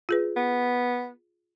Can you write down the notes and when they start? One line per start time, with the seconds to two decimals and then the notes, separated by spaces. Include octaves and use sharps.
0.09 F4 G#4 B4
0.36 B3